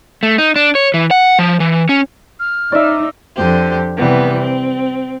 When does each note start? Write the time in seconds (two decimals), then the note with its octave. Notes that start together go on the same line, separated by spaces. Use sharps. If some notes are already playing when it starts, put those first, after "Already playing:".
0.23 A3
0.38 D#4
0.56 D4
0.75 C#5
0.94 E3
1.11 F#5
1.39 F3
1.60 E3
1.89 C#4
2.40 F6
2.72 D#4 D5 E5
3.36 F2 D3 G4 C5
3.96 C3 E3 G3 B3
4.37 C4